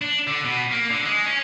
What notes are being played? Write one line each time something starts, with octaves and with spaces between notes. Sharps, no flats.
D4
D3
B2
A#3
D3
G#3
C#4